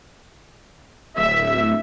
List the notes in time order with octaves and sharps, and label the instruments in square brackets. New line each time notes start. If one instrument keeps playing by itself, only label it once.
[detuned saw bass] D1 [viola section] E5